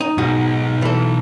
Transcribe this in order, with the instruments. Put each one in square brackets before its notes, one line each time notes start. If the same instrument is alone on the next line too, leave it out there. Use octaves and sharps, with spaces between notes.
[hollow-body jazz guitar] D#4
[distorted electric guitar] B1 [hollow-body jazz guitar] G#2 D#4 F#4
[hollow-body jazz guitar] E3 A4